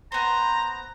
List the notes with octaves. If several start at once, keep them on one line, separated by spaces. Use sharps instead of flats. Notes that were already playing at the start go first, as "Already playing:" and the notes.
B3 C5 A#5